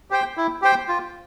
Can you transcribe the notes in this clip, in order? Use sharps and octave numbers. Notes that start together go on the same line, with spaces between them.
G4 C5 G5
E4
G4 C5 G5
F4